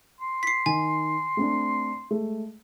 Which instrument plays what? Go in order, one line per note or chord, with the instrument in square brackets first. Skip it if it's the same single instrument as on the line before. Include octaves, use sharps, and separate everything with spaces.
[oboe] C6
[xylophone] B6 C7
[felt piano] D#3 [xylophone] G#5
[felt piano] A3 C4 D4
G#3 A3